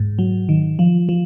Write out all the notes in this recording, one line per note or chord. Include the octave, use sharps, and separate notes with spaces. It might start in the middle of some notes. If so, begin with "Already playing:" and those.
Already playing: G#2
F#3
D#3
F3
F3